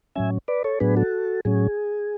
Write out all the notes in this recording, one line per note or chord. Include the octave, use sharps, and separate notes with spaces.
A2 F#3 C#4 E5 G#5
B4 D5
A4 C#5
A2 F#3 B3 D4 G#4 B4
F#4 A4
A2 F#3 C#4 G#4